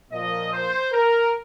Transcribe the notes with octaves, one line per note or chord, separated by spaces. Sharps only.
A#2 F3 A#3 D#5
C5
A#4